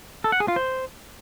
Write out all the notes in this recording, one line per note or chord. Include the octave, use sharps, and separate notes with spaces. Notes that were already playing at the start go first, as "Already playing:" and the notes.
A4
F#5
G#4
F4
C5